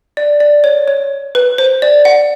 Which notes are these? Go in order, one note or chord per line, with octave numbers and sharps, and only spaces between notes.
D5
D5
C#5
C#5
B4
C5
D5
F#5